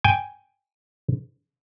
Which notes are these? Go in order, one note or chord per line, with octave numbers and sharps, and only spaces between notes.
G5 G#5